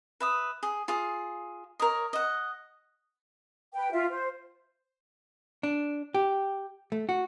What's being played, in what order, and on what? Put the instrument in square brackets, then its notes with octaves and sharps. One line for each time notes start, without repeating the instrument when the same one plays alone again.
[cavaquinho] B4 E5 D#6
G#4
F4 G#4
A#4 C#5 D#5
D#5 F#5
[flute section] B4 G5
F4 E5
C5
[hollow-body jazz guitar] D4
G4
A3
F#4